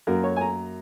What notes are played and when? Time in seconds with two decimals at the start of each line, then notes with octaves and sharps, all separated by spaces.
0.07 F#2 F#3 A#3 A#4
0.24 C#5
0.36 G#5
0.41 A#5